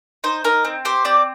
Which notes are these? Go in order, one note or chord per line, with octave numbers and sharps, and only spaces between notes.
D#4 C5
D#4 A#4
C4
G4 C5
C4 D5